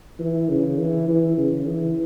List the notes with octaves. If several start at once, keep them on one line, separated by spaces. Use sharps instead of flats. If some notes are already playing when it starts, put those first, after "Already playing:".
E3
C#3
E3
E3
C#3
E3